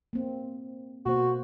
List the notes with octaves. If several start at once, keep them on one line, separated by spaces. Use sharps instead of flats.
A#3 C4
B2 A#3 F#4 C5